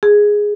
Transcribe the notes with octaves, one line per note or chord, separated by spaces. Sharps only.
G#4